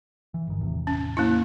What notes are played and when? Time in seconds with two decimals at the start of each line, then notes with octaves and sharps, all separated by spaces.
0.34 E3
0.47 G1 D#3
0.61 E2 A2 C3
0.87 C#4
1.17 A#3 C#4 E4